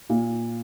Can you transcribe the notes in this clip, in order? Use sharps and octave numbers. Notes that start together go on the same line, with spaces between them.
A#2